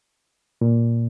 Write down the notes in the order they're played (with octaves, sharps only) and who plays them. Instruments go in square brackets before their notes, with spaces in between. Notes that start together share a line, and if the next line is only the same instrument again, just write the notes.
[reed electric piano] A#2